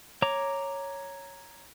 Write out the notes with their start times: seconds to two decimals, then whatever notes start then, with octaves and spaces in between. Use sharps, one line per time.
0.22 C#5 A#5 D6